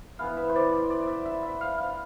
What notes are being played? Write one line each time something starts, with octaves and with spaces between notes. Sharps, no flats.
E3 B3 E4 F5
E5
C5
D5
D5
D5
E5
E5
E5
F5
F5